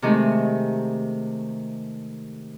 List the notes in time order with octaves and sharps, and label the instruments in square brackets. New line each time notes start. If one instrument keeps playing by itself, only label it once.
[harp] C3 D#3 G#3 A3